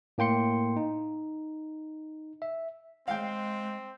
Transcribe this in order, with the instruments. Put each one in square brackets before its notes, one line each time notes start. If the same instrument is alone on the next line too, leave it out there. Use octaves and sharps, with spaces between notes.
[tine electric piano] A2 A#3 G5 C6 C#7
D#4
E5
[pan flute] G#3 [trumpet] C4 [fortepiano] F5 G5